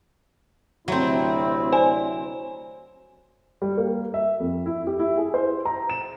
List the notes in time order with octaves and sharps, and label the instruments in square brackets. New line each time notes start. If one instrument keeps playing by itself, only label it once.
[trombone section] D2 C3 E4 [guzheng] F#3 C4
[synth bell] C5 [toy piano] D5 G#5
[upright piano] G3
A#3
E5
F2
E4
G4
E4
G#4
C5
A#5
E7